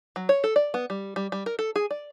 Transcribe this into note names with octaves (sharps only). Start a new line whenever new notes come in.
F#3
C#5
A4
D5
B3
G3
G3
G3
A#4
A4
G#4
D5